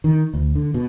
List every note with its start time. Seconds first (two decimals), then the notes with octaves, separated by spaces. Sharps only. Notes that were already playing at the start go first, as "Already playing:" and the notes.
0.04 D#3
0.34 D2
0.55 D3
0.74 B2